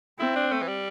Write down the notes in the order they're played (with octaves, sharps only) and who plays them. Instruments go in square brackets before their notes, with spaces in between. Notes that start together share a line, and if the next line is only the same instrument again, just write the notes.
[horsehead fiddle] C4 [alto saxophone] E4
[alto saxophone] D4
A3
E3
G3